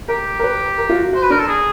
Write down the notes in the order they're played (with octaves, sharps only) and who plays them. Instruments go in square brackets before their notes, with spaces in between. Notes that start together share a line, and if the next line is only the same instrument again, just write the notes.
[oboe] G4 [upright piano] A#4
[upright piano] A#4
B4
A#4
F4
F#4
[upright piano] F#4 [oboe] C5
[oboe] B4
[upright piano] D4 [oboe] A#4
[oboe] A4
G#4